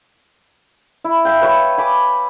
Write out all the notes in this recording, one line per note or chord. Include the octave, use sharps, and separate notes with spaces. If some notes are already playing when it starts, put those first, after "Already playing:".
E4
E5 F5 G5
B4 C#5 C#6
G#5 B5 D6